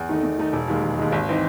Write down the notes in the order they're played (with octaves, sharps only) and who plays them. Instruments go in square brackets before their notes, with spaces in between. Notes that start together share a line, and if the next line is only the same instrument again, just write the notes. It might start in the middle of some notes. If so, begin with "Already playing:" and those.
Already playing: [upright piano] E2
D#3 A3 D#4
E2
D#3 A3 D#4
E1
D#2 D#3 G#3
E1
D#2 D#3 G#3
G#1
E3 C4 D#4